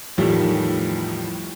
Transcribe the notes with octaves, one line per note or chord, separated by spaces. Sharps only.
E2 A2 D#3 F3 G3 A3